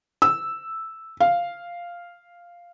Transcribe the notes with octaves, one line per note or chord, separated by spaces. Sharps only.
E6
F5